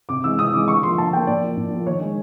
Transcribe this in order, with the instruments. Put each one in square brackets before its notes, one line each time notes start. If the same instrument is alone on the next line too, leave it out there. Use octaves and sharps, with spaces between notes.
[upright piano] C3 D6
E3 G#3 E6
C3 D#6
E3 G#3 D6
D3 C#6
F3 A#3 C6
D3 A5
F3 A#3 G5
A#2 D5
F3 A#3
A#2
F3 A#3
D#3 C#5
G#3